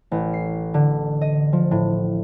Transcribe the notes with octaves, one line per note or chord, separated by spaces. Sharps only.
A1
C7
D3
D#5
F3
A2